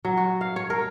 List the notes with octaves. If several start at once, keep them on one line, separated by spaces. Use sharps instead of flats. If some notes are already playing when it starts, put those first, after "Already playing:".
F#3
F#4
F5
C#5
A#4